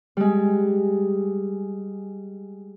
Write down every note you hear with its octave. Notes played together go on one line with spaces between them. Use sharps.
G3 G#3